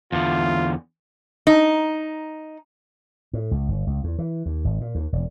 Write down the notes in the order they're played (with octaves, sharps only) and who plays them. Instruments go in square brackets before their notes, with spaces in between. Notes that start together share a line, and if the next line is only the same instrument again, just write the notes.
[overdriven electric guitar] E2 D3 [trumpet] F4
[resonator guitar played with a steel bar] D#4
[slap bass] A2
C#2
G1
C#2
E2
E3
D#2
G#1
A#2
D#2
E1